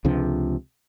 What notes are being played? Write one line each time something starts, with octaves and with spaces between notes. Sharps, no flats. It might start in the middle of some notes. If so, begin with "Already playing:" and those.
C#2 C3 F3 D4